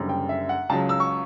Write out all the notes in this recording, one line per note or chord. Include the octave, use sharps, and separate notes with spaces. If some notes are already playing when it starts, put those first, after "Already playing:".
Already playing: F#1 F#2 D3 G3
G5
E5
F#5
C#2 C#3 F#3 A5
E6
C#6